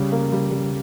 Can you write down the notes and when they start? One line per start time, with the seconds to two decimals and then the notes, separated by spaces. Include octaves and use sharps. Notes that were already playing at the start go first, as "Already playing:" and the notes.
Already playing: C#3 G3
0.12 A#3
0.32 G3
0.51 G3